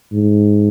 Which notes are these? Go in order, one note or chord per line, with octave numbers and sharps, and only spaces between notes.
G#2